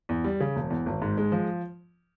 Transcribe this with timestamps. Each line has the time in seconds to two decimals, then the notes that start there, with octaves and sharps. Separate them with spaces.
0.09 E2
0.24 G3
0.40 C#3
0.56 E1
0.70 E2
0.86 G#1
1.02 G#2
1.18 G#3
1.32 F3